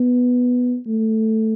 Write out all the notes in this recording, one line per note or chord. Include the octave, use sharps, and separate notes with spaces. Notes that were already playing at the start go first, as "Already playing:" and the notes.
Already playing: B3
A3